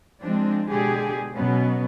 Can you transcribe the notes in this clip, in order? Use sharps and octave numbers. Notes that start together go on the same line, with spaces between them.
F3 G#3 C4 D4
B2 D3 G#3 G4 G#4
B2 F#3 B3 C#4